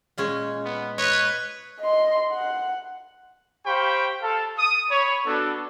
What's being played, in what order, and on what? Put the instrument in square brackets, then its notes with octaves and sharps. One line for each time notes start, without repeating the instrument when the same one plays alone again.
[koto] A#2 G#3 C#4
[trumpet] B3
[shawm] B4 [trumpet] C#5 [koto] D#5
[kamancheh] D#5 C6
F#5
[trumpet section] G4 C5 F5 G5 B5 C#6
A4 F5
D#6
C#5 B5
B3 D4 F#4 A4